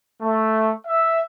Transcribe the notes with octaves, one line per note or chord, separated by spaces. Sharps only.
A3
E5